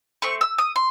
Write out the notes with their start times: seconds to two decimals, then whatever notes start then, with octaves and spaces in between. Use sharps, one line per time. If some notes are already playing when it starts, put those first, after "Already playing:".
0.22 A3 C4 C#6
0.41 E6
0.58 D#6
0.76 C6